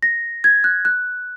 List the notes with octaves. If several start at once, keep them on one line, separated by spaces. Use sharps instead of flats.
A#6
G#6
F#6
F#6